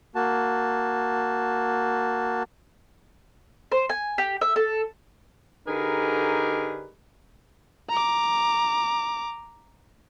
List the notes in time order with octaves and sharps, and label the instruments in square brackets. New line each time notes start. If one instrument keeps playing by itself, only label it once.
[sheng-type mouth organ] A#3 F#4 A5
[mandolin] C5
G#5
G4
E5
A4
[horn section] D3 D#4 G4 G#4 A#4 B4
[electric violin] A#5 D6